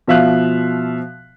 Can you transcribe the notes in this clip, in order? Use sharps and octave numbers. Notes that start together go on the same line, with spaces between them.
B2 F3 E5 F5 F#6